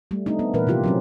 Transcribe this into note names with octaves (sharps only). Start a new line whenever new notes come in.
G3 A3
A3 C4 D4 D#4
B3
A#2 E3 A#4 B4
C3 F3 F4 G4
F#3 C4 C#4